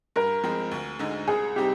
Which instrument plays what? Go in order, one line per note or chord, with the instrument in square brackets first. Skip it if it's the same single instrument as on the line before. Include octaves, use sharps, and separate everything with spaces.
[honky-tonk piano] G2 [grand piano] A#4
[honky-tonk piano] F3 G#3 C4
D2
D3 G#3 D#4
[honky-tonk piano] C2 [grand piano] G#4
[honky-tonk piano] C3 G3 C4 D#4 [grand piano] G4